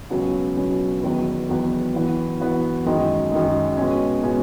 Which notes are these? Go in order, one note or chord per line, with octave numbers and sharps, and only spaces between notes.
C#2 B2 F#3 C#4
C#2 B2 F#3 C#4
E2 D#3 F#3 B3
E2 D#3 F#3 B3
E3 B3 F#4
E3 B3 F#4
F#2 D#3 G#3 D#4
F#2 D#3 G#3 D#4
B2 G#3 C#4
B2 G#3 C#4